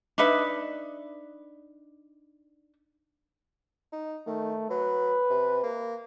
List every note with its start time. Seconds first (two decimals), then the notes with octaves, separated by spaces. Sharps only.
0.18 D4 D#4 B4 E5
3.93 D#4
4.27 D#3 A3
4.70 F#3 B4
5.30 C3
5.63 A#3